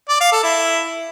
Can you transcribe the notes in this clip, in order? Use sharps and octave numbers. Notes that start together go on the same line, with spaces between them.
D5
F5
A4
E4